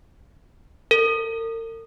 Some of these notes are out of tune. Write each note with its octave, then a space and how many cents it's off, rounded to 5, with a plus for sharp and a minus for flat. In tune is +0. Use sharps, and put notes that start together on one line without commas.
A#4 -45